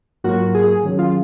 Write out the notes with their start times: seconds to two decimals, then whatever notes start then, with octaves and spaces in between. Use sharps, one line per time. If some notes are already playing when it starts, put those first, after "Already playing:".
0.24 G#2 F#3 A#3 F4 F#4 A#4
0.55 G#4
0.84 D#3 F#3 C#4 G#4
0.99 F4